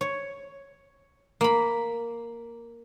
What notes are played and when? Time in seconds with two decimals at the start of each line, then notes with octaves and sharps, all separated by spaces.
0.01 C#5
1.41 A#3 B5